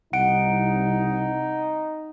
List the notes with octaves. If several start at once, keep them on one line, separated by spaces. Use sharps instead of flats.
C2 D#4 F#5 D7